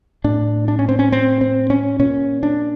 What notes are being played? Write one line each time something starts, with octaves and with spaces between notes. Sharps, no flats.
A2 D4
D4
C#4
C4
C#4
C4
C4
C#4
A#2 C#4
D4